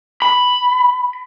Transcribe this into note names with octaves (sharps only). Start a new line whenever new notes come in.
B5